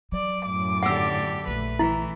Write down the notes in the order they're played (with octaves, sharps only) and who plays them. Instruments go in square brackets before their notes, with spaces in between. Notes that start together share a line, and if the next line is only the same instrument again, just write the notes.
[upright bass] F#3 [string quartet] D5
[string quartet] F#2 A2 D6
[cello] D3 G4 [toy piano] F#5 E6
[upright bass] A#1 [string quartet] A3 [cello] B4
[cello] E3 [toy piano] E4